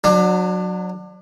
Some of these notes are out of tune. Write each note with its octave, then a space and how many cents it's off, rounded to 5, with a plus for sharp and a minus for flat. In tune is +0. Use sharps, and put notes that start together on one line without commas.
F#3 -15 D4 +30